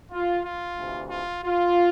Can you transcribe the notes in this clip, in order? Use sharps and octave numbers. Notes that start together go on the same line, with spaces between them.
F4
F4
D2 C3 E3
F4
F4